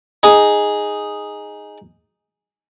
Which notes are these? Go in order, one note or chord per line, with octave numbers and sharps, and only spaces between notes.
D#4 G#4